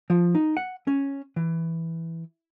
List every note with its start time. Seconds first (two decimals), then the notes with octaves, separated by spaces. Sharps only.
0.10 F3
0.35 D#4
0.57 F#5
0.87 C#4
1.36 E3